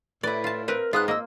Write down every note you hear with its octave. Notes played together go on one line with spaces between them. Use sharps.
A2 E4 B4 D5
F4 A5
C4 A#4 B4
G#2 F4 B4 D#6 F#6
A#3 D#5 E6